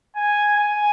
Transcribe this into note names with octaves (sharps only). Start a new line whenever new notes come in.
G#5
G#5